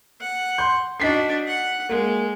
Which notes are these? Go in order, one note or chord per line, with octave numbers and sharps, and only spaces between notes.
F#5
C6 G6
D4 D#4 F#4 B6 C7
F#5
G#3 A#3